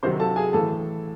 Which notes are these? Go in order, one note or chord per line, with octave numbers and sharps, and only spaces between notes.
C3 D#3 F#3 C5 C6
A4 A5
G#4 G#5
A2 E3 A4 A5